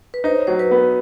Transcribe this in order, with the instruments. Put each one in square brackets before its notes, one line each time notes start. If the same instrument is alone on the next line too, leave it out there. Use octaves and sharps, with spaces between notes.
[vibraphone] B4
[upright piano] D#4 [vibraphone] C5
[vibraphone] C#5
[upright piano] F#3 [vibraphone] C5
[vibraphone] B4
[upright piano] B3